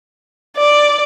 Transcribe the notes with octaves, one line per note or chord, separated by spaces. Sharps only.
D5